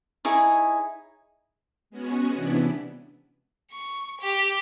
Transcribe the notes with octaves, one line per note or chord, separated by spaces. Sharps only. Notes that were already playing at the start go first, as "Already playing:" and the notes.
D#4 E4 G#4 C#5
G#3 B3 C#4 F#4 G#4
C3 E3 B3 D4 E4
C#6
G4